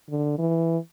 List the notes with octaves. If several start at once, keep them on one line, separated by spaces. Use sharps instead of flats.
D3
E3